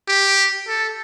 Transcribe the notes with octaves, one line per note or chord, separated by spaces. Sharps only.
G4
A4